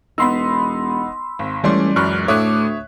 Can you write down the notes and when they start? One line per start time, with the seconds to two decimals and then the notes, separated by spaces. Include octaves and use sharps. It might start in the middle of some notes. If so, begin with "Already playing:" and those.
0.18 E1 B3 D#4 B5 C6 E6
1.39 G#1
1.64 C#2 E3 G3 A3 C#4 D5 C6
1.96 F#2 B5 C#6 F6 F#6
2.28 D2 A2 A3 C#5 E5 D6 D#6 F#6